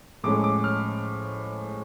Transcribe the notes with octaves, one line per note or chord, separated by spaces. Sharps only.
A2 F3 G#3 C#4 D6
D6
F6